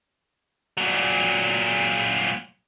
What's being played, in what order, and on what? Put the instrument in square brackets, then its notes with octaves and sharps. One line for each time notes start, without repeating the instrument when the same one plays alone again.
[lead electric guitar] A#2 F#3